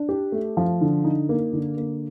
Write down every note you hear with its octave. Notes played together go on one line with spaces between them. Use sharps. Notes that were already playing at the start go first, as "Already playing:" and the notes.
Already playing: D4
G4
A3
F3
D3
D#4
A#3
D3
A#3